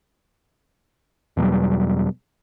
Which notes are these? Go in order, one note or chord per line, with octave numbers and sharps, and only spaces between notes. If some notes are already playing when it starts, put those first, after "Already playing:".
E2 B2 F#3 G3